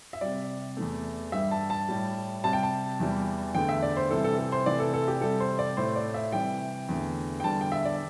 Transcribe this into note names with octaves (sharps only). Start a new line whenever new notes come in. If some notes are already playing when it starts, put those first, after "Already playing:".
E5
C3 G3 D5
E2 E3 A3
G2 G3 E5
A5
A5
A2 G3
C3 G3 A5
G5
A5
E2 E3 G3
E2 D3 A3 G5
E5
D5
C5
C3 E3 G3 A4
A4
A4
C5
C3 E3 A3 D5
A4
A4
G4
C3 G3 A4
C5
D5
A2 A3 C5
D5
E5
C3 E3 G3 G5
E2 D3 A3
G5
E2 D3 G3 A5
G5
E5
D5